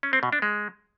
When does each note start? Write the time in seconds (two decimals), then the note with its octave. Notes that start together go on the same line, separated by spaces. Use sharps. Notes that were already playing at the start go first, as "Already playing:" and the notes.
0.03 C#4
0.13 C4
0.23 B2
0.33 D4
0.42 G#3